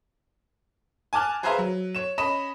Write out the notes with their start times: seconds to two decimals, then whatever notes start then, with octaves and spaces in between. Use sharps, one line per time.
1.13 G#5 A5 D6 F6 F#6
1.43 G#4 B4 C5 E5 F5 A#5
1.58 F#3
1.95 C#5 E7
2.18 C#4 D#5 B5 E7